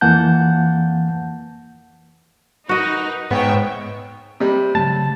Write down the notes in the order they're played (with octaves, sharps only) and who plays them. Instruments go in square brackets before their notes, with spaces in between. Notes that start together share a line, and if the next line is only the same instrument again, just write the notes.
[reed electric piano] F2 E3 A#3 F#5 A5 G6
[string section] D#4 A#4 B4 [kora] F#4 D#5
[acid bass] G#2 [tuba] B3 [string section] C#5 E5 G5
[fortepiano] C3 G3
[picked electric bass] C#3 F#3 A3 [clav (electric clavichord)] A5